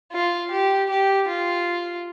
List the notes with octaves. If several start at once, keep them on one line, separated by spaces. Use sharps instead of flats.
F4
G4
G4
F4